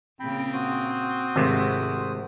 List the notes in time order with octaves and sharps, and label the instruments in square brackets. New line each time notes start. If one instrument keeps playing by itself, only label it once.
[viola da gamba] A#2 C#3 [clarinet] C4 [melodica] G5 B5
[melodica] F#4 C5 D#6
[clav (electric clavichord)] G#1 C3 [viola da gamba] G#3 A3 E4